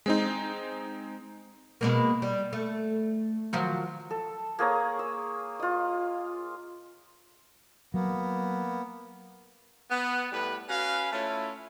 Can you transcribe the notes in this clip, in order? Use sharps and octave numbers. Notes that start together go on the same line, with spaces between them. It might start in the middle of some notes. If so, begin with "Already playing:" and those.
G#3 C4 D#4
B2 G#3 A#3
G3
A3
D#3 F3 F#3
A4
A#3 G#4 C#5 A#5
E6
F4 D#5
F#3 A#3 B3
B3
A2 G3 B4
C#4 F#4 B4 F5
A3 C#4 E4 F4